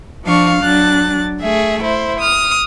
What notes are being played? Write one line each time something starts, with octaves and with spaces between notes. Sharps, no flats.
F3 D4 F5 C#6
F#3 D4 F#6 A6
A3 G#4 E5
E4 C5
D#6 F6